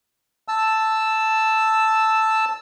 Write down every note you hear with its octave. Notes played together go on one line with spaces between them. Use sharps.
A5 E6